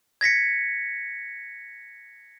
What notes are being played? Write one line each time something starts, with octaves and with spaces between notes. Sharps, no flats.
G#6 A#6 B6 C#7